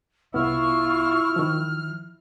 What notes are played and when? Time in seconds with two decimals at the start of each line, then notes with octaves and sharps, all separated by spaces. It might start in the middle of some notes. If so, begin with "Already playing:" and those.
0.34 C2 B3 E4 F4 C#6 F6
1.36 D#3 F3